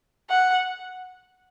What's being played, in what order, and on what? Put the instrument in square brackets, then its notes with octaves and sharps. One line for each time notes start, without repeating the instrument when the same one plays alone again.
[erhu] F#5